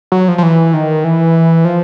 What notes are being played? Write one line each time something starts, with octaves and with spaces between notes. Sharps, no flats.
F#3
F3
F3
E3
D#3
E3
F3